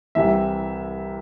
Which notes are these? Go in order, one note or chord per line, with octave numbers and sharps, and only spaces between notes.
C2 C3 E3 E5